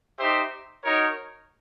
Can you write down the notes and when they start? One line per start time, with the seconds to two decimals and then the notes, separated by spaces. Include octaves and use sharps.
0.18 D#4 G4 C5 E5
0.84 D#4 F#4 A#4 C#5